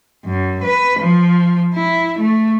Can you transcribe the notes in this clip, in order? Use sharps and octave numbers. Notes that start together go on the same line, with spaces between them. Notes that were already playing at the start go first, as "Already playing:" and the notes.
F#2
B4
F3
E4
A3